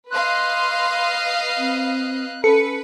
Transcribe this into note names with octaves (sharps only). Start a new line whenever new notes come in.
B4 D#5 F5 C6 F#6
C4
C#4 A4 B4 C#7